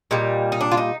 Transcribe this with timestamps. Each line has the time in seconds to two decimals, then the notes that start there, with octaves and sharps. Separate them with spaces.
0.11 A#2 G3 D#4
0.52 D#4
0.61 D4
0.71 F4
0.77 D#4